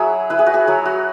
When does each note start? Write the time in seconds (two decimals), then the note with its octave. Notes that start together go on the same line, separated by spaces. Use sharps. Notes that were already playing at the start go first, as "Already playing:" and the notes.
Already playing: F#3 E4 F#4 G#4 C#5 E5
0.30 E4 B4
0.39 G#4
0.46 F#4
0.54 G#4
0.67 F#3 C#5
0.86 F#4